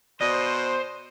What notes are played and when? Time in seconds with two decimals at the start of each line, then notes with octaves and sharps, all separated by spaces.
0.21 B2 C5 D5 D#5